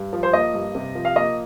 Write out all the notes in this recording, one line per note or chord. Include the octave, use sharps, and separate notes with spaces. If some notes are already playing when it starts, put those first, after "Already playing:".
Already playing: G2
F3
C5
A#3 D#5
G2
C3
F3
F5
A#3 D#5